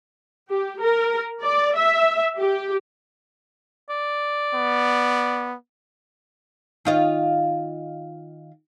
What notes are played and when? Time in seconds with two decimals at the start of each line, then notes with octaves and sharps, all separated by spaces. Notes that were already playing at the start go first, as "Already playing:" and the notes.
0.51 G4
0.81 A#4
1.42 D5
1.76 E5
2.38 G4
3.90 D5
4.55 B3
6.85 D#3 F4 D#5